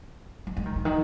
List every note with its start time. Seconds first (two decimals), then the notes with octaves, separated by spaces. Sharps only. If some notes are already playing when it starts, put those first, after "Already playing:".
0.47 F#3
0.57 G#3
0.66 D#3
0.76 C#3
0.85 D#3